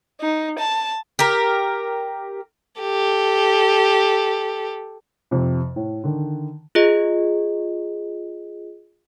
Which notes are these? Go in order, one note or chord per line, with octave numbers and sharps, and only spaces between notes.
D#4
A5
G4 A#4
G4 A4
F2 C3
A2
D3 D#3
F4 G#4 D#5